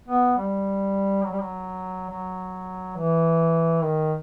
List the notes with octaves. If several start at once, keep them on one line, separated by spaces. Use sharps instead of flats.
B3
G3
F#3
G3
F#3
F#3
E3
D#3